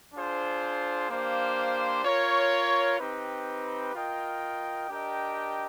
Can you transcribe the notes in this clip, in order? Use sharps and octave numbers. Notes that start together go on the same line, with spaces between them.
D4 F4 G#4 C5
A#3 D4 G4 C5 F5
F4 A#4 C#5
C4 D#4 G4 B4
F4 A#4 D#5 G5
D4 G4 A#4 D#5 G5